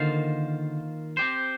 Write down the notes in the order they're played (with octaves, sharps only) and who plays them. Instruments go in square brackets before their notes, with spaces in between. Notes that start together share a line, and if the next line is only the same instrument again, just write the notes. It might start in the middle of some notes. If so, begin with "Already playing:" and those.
Already playing: [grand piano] D3 [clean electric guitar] D#3 A#3 F4 C5 F5
[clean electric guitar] C4 G4 C5